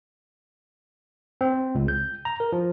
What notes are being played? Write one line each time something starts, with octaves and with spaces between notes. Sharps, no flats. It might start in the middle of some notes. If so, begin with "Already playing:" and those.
C4
C#2
G6
A#5
A#4
F3